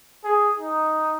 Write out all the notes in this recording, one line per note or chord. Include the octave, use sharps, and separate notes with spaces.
G#4
D#4